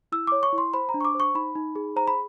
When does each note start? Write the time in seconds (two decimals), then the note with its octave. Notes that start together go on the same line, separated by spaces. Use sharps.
0.12 E4 E6
0.27 C#5 D6
0.43 C#6
0.53 E4
0.58 C6
0.74 C5 B5
0.89 A#5
0.94 D4
1.01 C#6
1.05 D6
1.15 C5
1.20 C#6
1.35 D#4 B5
1.55 D#4
1.76 G#4
1.96 C5 A#5
2.08 B5